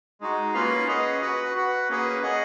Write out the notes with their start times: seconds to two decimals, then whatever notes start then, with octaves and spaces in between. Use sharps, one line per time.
0.21 G#3 D#4 F#4
0.54 A#3 C#4 F4 B4 F5
0.88 C#4 G#4 B4 D#5 F#5
1.22 F#4 B4 F#5
1.55 F#4 B4 F#5
1.89 A#3 C#4 G#4 B4 F#5
2.23 C#4 G#4 D#5 F#5